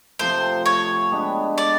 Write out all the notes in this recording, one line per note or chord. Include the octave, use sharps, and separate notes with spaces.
C3 F3 A3 C5
C#5
G#3 B3 D4 G4
D5